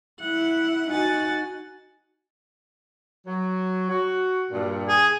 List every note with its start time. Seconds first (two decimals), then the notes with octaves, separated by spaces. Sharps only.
0.21 E4 F#5
0.89 D#4 F#4 F#5 G#5 A6
3.26 F#3
3.89 F#4
4.51 G2 A#2
4.88 G#4